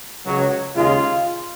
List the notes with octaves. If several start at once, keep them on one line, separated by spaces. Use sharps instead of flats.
C#2 C#3 F#3
D#2 C#3 G#3 F4